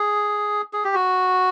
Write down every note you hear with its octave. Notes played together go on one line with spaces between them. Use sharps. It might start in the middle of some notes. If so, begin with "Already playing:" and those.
Already playing: G#4
G#4
G4
F#4